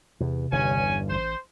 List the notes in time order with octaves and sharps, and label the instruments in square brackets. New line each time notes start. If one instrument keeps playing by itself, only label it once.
[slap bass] E2 [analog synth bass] C3
[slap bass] G1 E2 G2 [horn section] C#4 G#5
[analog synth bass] A1 [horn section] C5